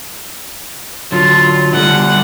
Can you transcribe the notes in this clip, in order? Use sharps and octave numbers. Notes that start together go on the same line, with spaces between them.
D3 F#3 F4
D3 G3 A3 F#5